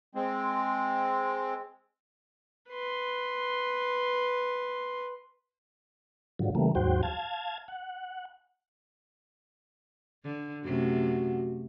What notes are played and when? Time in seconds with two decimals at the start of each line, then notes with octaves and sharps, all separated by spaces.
0.15 G#3 C4
2.70 B4 C6
6.39 G#2 D3 F3 F#3
6.55 C#3 E3 G3 A3 A#3
6.75 D#2 G#2 F#3 F#4 C5 G5
7.03 F5 A5 G#6
7.68 F#5
10.24 D3
10.64 F#2 C3 A3 F#4